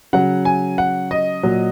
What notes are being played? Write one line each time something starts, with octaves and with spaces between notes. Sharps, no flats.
C#3 F#3 F#5
G#5
F#5
D#5
A#2 F#3